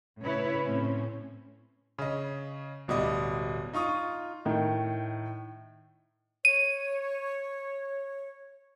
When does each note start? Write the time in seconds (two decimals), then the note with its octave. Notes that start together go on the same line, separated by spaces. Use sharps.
0.20 A2 C#3 E4 B4 C#5
0.62 A2 C4 C#4
1.98 C#3 D#5
2.88 D1 B2 G3 D#5 D6
3.73 D#4 F4 C#6 D#6
4.45 A2 D#3
6.45 C#5 D#7